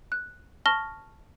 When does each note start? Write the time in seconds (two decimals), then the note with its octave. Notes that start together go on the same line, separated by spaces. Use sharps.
0.12 F#6
0.66 A5 C#6 F6 A#6 G7